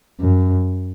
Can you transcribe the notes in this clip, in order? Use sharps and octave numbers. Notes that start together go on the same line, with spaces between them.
F#2